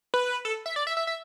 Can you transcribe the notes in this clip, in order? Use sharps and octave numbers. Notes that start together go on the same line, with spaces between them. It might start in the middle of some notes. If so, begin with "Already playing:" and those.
B4
A4
E5
D5
E5
E5
E5